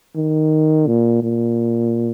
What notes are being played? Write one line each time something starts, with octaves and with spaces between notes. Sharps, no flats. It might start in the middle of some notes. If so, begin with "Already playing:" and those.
D#3
A#2
A#2